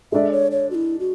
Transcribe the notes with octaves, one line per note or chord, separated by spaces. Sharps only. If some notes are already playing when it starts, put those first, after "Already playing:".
G#3 D4 A4 D5 E5
C#5
C#5
F#4
E4
F#4